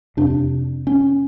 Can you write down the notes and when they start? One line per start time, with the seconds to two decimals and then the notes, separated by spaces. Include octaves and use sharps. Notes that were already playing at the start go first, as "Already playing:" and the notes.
0.17 F2 C3 D4
0.87 C#4